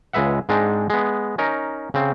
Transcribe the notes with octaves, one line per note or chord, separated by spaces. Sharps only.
C#2 G#3 B4 E5 F#5
G#2 G#3 C4 D4 D#4
G#3 B3
C#4 D#4 A#4
C#3 C4